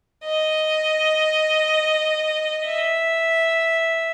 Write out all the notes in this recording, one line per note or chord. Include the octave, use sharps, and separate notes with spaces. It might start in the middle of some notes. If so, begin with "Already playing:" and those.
D#5
E5